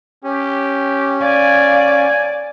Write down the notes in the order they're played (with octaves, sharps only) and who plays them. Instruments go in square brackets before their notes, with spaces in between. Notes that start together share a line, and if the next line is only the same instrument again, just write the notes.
[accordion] C#4 [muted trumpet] G4
[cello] D5 [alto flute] F5 [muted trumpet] G#5